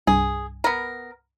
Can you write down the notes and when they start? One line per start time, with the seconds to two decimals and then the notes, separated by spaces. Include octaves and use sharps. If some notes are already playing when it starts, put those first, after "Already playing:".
0.07 C2 G2 G#4
0.64 B3 A#4